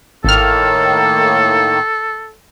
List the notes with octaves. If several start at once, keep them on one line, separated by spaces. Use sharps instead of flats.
G#1 A2 D#3 A#3 A4 F6